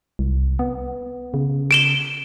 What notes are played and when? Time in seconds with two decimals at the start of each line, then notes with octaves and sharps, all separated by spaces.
0.19 C2
0.59 B3
1.34 C#3
1.71 D7 E7 G7